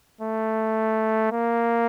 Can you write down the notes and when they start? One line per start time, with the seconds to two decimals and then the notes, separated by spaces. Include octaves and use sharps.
0.21 A3
1.31 A#3